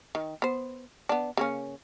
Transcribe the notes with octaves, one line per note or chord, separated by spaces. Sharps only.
D#3
B3 C5
B3 D4
C#3 A#3 C#4